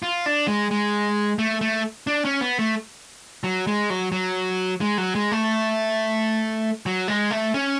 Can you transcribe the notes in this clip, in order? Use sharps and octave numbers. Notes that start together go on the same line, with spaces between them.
F4
D4
G#3
G#3
A3
A3
D4
C#4
B3
A3
F#3
G#3
F#3
F#3
G#3
F#3
G#3
A3
F#3
G#3
A3
C#4